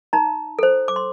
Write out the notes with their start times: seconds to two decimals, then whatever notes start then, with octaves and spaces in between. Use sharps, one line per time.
0.13 D#4 A#5
0.59 A4 C5
0.88 D6
0.96 C6